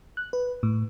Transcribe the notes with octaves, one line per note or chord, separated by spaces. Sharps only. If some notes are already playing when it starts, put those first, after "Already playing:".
F#6
B4
A2